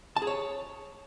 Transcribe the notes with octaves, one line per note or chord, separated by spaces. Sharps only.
A5
G#4
C#5